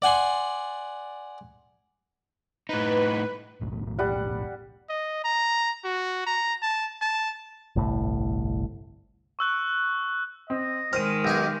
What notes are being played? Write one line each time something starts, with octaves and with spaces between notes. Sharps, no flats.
D5 F#5 G#5 C6
A2 D#4 B4
E1 B1 A2
G3 F#5
D#5
A#5
F#4
A#5
A5
A5
G1 C2 A2
C#6 E6 F#6
C4 D#5
D#3 G#3 C5 F6 D#7
B1 D#4 G4 G#5 A#6